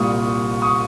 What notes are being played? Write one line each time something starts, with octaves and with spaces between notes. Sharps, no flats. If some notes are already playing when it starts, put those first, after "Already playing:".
Already playing: C2 A#2 G3 A#3 C#6 D#6
C#6 D#6